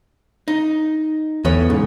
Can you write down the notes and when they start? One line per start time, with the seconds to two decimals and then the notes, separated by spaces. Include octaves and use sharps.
0.48 D#4
1.45 E2 A2 B4 C#5
1.70 B1 G#2 C#3